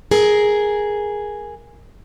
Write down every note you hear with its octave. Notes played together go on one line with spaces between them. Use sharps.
G#4 A#4